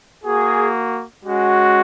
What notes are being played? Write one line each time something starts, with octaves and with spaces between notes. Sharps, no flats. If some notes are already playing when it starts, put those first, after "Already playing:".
A#3 F#4 G#4
G#3 C#4 F#4